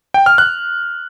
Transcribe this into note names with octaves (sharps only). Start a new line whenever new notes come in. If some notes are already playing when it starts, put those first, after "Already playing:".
G5
F6
F#6